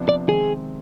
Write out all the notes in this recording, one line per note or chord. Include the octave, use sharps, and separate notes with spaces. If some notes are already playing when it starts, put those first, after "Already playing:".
Already playing: C3 F3 B3 D4
D5
C3 D#3 G#3 C4 G#4